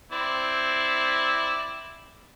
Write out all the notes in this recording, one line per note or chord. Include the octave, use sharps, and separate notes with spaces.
C4 E4 D5